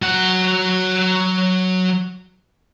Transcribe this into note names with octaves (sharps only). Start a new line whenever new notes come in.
F#3 F#5